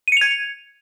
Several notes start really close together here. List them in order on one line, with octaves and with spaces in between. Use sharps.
D#7 C#7 F7 G#6